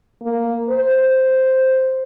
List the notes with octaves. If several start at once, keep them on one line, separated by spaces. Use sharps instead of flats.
A#3
C5